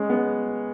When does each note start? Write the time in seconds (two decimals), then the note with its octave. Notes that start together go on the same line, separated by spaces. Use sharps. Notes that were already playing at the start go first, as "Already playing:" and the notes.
Already playing: G#3 C#4
0.09 B3